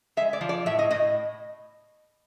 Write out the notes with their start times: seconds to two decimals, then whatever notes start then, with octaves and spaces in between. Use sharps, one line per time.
0.17 G#3 E5
0.33 D5
0.41 F3
0.49 D5
0.66 A2 E5
0.79 D#5
0.91 A2 D#5